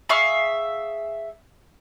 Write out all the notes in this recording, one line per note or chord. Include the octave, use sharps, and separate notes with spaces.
G#4 E5 F5 C#6